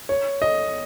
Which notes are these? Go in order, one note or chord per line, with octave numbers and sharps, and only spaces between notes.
C#5
D#5